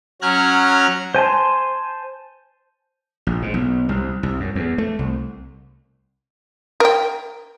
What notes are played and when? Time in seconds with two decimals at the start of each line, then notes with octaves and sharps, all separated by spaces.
0.22 F#3 C#4 A#5 F6 F#6 G#6
1.15 C5 G#5 A5 C6
3.27 A#1
3.42 G#2
3.54 B1
3.89 C2
4.23 C2
4.40 F#2
4.55 E2
4.78 A3
4.99 C2
6.80 A#4 G5